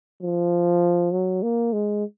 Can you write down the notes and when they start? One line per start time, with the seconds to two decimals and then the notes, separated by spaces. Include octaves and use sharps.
0.22 F3
1.12 F#3
1.43 A#3
1.73 G#3